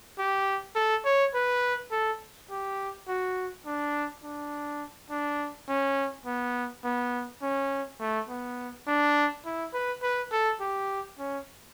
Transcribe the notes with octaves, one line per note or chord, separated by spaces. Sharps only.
G4
A4
C#5
B4
A4
G4
F#4
D4
D4
D4
C#4
B3
B3
C#4
A3
B3
D4
E4
B4
B4
A4
G4
C#4